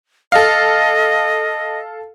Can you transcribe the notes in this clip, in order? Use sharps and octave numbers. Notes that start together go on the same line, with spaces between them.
A4 D#5 F5